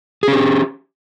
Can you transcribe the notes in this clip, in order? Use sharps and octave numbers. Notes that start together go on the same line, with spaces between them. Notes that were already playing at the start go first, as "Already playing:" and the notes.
C#4 G4 G#4